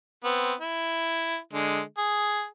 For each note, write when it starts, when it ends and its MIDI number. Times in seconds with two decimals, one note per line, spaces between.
0.24 0.53 59
0.24 0.53 60
0.61 1.38 64
1.53 1.81 50
1.53 1.81 56
1.98 2.45 68